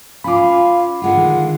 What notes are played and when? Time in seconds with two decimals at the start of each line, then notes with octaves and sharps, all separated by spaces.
0.24 C#4 F4 F5 B5 D6
1.02 D3 G#3 F4 F#5
1.18 D#3